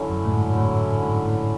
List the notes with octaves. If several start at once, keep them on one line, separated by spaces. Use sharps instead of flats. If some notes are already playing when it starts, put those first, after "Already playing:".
Already playing: D3 F#3 C#4 E4
F#2
A2
G#2
A2
G#2
A2